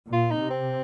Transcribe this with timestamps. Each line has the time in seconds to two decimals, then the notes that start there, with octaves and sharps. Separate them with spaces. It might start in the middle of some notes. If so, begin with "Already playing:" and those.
0.12 A#2 F4
0.31 D#4
0.40 C3
0.50 C4